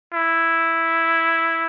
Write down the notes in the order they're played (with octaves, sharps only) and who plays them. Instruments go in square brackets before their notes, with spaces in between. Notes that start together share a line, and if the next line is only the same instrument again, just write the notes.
[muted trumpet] E4